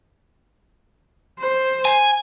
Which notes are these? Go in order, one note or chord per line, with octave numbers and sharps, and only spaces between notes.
C5
G#5